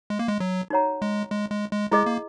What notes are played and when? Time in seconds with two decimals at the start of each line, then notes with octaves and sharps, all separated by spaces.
0.10 G#3
0.19 A#3
0.28 G#3
0.40 F#3
0.70 D#4 F#4 C#5 F#5 A#5
1.02 G#3
1.31 G#3
1.51 G#3
1.72 G#3
1.91 G#3 E4 G#4 D#5
2.06 A#3